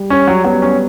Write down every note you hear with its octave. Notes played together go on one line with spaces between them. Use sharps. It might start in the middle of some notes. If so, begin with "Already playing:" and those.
Already playing: G3
C#4
F#3 G3
F#3 B3
C#4